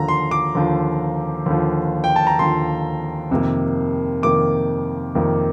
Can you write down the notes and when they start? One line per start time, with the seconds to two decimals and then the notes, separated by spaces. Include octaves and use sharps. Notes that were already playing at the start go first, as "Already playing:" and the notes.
Already playing: D#2 D3 F3 A#5
0.08 C6
0.31 D6
0.55 D#2 D3 F3
1.46 D#2 D3 F3
2.04 G5
2.16 A5
2.27 A#5
2.39 D#2 D3 F3 C6
3.31 F2 C3 D#3 A#3
4.22 F2 C3 D#3 A#3 D6
5.15 F2 C3 D#3 A#3